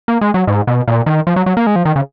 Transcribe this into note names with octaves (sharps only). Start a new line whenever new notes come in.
A#3
G#3
F#3
G#2
B2
A#2
D#3
F3
F#3
F#3
A#3
G#3
F3
D#3
C#3